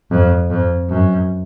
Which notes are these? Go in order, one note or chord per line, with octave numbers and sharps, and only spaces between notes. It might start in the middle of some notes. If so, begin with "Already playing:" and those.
F2
F2
F#2